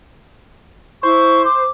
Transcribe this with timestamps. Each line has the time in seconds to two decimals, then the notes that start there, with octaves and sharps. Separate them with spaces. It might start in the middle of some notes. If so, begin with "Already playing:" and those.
1.03 E4 C5 C#6
1.45 D6